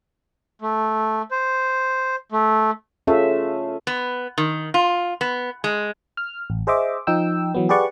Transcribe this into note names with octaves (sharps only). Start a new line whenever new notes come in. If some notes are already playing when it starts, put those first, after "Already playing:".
A3
C5
A3
A3 C#4 F4 G#4 E5 F5
B3
D#3
F4
B3
G#3
F6
A1
G#4 C5 D#5 E5 D6
F3 D#4 G5 E6
E3 F#3 B3
G4 G#4 B4 D5 F#5 C#6